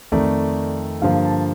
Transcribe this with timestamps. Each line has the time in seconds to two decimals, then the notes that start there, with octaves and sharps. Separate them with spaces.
0.12 F2 D#3 A3 D#4 D5
1.02 G2 D3 F3 A#3 F5
1.24 A5